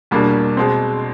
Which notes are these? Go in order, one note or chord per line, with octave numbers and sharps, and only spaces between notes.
E2 B2 G3 A#3 D4
B2 G#3 C4